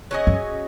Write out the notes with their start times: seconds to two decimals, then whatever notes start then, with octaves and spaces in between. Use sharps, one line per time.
0.11 F#3 C#4 G#4 D#5
0.27 F#2